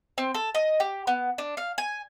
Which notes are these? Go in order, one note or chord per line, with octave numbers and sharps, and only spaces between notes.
C4
A4
D#5
G4
B3
D4
F5
G#5